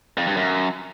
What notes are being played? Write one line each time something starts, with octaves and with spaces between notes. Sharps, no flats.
F2
G2
F#2